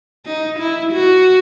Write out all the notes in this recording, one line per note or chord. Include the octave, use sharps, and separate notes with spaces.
D#4
E4
F#4